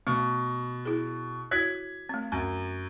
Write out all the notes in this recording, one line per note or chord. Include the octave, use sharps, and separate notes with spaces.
B2 A3
E4 G#4
E4 F#4 C#5 F#6 G#6 B6
A3 C4
F#2